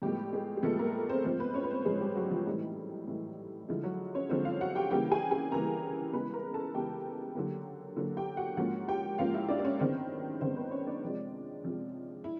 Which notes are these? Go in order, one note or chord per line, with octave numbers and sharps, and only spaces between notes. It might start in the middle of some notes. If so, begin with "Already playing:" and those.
A2 F3 G3 G#3 B3 G4
G#3 G#4
G#4
A2 F3 G#3 A3 B3 A4
A#3 A#4
C4 C5
G#2 F3 G#3 C4 C5
B3 B4
C#4 C#5
B4
C4 C5
G#2 F3 G#3 G#4
G3 G4
F#3 F#4
F3 F4
A2 E3 G3 D#4
A2 E3 G3
D3 F3 G#3 E4
F#3 F#4
C#4 C#5
D3 F3 G#3 C4 C5
F4 F5
F#4 F#5
G4 G5
C#3 E3 G3 A#3 G4 G5
G#4 G#5
G#4 G#5
C#3 E3 G3 A#3 A#4 A#5
C#3 E3 G#3 B3 B4 B5
A#4 A#5
A4 A5
C#3 E3 G#3 B3 G4 G5
D3 F#3 A#3
D3 F#3 A#3
G4 G5
F#4 F#5
G#2 F3 A#3 C#4 F#4 F#5
G4 G5
G#2 F3 A#3 C#4 F4 F5
E4 E5
D4 D5
D5
C#4 C#5
F#2 D#3 G#3 B3 C4 C5
F#2 D#3 G#3 B3 C4 C5
B3 B4
C#4 C#5
D4 D5
C3 F3 G#3
C3 F3 G#3
E4